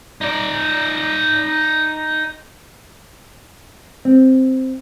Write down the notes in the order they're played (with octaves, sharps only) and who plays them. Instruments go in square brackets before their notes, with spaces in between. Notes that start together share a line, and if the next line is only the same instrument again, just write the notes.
[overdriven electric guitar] D#4 D5
[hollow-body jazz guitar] C4